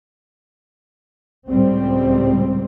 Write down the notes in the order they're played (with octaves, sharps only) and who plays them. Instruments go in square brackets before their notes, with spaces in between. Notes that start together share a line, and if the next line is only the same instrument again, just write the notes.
[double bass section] C#2 A2 G3 C4